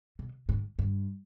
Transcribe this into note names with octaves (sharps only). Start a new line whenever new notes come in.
B2
G#2
G2